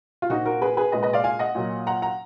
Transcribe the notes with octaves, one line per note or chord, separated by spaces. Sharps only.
F4
A#2 F3 A#3 D#4 F#4
F#4 A#4
G#4 B4
G#4 B4
A#2 G#3 B4 D#5
B4 D#5
D5 F5
F5 G#5
D#5 F#5
A#2 F#3 A#3
F#5 A#5
F#5 A#5